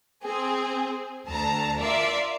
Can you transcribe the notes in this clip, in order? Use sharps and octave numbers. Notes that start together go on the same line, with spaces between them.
C4 G#4
D2 A5 A#5
F4 A#4 D5 E5